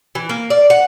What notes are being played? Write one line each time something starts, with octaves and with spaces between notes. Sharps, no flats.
E3
A#3
D5
F#5